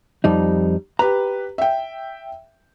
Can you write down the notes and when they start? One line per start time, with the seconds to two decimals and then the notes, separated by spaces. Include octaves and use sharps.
0.24 F2 G3 D#4
0.99 G4 B4 A#5
1.58 E5 G5